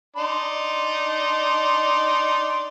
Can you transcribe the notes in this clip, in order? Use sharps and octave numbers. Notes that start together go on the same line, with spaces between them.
D4 D#4 C6